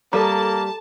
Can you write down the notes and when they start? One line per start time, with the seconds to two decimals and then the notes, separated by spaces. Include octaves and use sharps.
0.13 G3 A#3 A4 A5 A#5